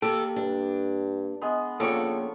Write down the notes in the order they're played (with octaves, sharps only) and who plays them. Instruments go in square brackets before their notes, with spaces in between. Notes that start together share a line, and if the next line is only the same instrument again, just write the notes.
[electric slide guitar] A#3 G4 G5 [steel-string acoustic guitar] A4
[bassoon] G2 [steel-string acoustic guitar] D4
[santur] G#3 B3
[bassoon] C#3 [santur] F3 D4 C#6 [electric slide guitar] A#3 G5 [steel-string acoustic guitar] A4